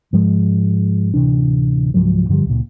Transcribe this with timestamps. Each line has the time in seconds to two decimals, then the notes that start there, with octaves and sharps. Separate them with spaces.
0.13 G#2 F3 G#3
1.14 D1 C3 E3 D4
1.94 C#2 G#2 F3 F#3
2.29 G2 D3 F3 G3
2.46 C#2 A#2